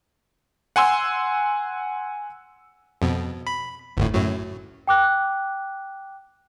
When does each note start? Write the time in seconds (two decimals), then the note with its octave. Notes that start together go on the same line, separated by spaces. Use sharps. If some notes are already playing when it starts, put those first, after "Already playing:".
0.76 F#5 G#5 C6 E6
3.02 F2 B2
3.47 B5
3.97 G1 D2 A2
4.14 F#2 A2 F#3
4.87 G5 D6 F#6